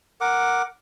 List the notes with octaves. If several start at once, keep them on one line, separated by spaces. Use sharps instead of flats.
A#4 F#5 D6